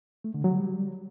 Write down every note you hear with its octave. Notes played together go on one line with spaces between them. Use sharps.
A3
D3
F#3
G3